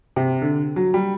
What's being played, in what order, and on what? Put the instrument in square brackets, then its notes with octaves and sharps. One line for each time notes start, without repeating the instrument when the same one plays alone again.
[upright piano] C3
D3
F#3
G3